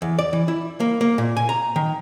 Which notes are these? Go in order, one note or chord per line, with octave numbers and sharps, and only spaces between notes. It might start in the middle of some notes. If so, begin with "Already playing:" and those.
E2
D5
E3
E4
A#3
A#3
A#2
G#5
A#5
D#3